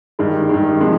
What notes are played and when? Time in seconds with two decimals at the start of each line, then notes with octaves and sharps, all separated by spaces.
0.19 G2 D#3 G#3
0.49 G2 D#3 G#3
0.80 C3 F3 G#3 D#4